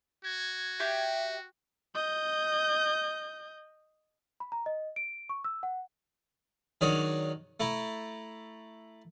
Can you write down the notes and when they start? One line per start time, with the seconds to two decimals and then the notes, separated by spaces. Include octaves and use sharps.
0.24 F#4 G#6
0.80 G4 E5
1.95 D#5 G6
4.40 B5
4.52 A#5
4.66 D#5
4.96 D7
5.29 C#6
5.44 E6
5.63 F#5
6.81 D#3 F#3 D4 G#4 C#5
7.60 A3 E4 A#5